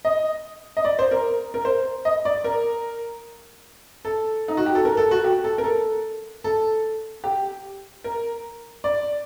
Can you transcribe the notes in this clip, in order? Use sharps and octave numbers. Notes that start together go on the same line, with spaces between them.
D#5
D#5
D5
C5
A#4
A#4
C5
D#5
D5
A#4
A4
D#4
F#4
G4
A4
A#4
A4
F#4
G4
A4
A#4
A4
A4
G4
A#4
D5